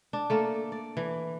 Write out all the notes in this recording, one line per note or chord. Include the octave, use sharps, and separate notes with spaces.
D4
A3 A#3 A4
D5
E3